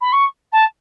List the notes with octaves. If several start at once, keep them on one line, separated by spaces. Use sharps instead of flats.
B5
C#6
A5